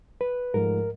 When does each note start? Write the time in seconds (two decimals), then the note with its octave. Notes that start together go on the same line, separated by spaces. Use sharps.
0.21 B4
0.54 G#2 F3 A3 A#4